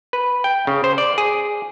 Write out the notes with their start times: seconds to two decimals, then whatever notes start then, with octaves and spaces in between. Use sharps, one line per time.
0.13 B4
0.44 G5
0.67 C#3
0.84 C5
0.98 D5
1.18 G#4